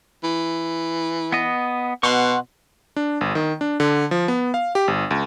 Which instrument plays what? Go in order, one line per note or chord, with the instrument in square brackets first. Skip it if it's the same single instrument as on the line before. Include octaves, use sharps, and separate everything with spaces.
[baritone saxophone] E3
[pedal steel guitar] B3 D#5
[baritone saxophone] B2 [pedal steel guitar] F#5 C6 C#6
[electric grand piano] D4
G1
D#3
D4
D3
F3
B3
F5
G4
G1
C#2